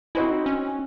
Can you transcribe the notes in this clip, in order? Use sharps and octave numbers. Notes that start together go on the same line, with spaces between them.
C4 E4 F#4 C5 D#5
D#4
C#4